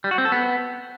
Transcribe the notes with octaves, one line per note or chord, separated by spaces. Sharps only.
G3
F#4
C4
A4
B3